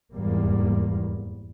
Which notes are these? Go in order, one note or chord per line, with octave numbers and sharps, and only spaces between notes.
F1 E2 G#2 G3 A#3